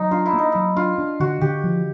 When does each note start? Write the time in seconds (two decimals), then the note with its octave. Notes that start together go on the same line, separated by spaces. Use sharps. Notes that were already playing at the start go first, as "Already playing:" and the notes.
Already playing: F#3 D#4
0.11 D4 F4
0.26 E4
0.33 A#3
0.38 D#4
0.52 F#3 E4
0.76 D4 F4
0.98 D4
1.20 D3 F#4
1.41 D3 G4
1.64 F3